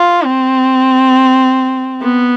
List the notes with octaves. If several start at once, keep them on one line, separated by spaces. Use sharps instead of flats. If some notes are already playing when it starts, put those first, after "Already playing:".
Already playing: F4
C4
B3